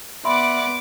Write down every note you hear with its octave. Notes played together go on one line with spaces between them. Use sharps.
B3 D5 E5 F#5 B5 C6 D6